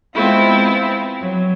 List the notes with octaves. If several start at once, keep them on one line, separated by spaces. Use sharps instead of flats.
G#3 B3 C4 E4 F4
F#3